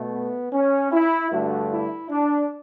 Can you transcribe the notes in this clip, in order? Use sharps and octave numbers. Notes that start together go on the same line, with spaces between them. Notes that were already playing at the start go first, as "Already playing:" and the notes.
Already playing: B2 A3
B3
C#4
E4
G2 D3 A3 F#4
E4
D4